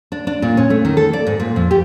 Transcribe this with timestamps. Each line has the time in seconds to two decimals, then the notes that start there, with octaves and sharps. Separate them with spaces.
0.12 D4
0.27 D4
0.42 A#2
0.57 C#4
0.70 A3
0.85 D#3
0.97 A4
1.13 D5
1.26 G#2
1.40 A#2
1.56 F2
1.71 G4